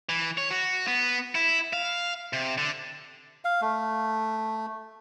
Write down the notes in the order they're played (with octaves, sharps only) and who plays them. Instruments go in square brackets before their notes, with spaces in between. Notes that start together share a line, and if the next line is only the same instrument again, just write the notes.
[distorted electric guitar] E3
C#5
F#4
B3
E4
F5
C3
D3
[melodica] F5
A3